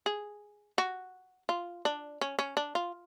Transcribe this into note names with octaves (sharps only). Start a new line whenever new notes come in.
G#4
F#4
F4
D4
C#4
C#4
D4
F4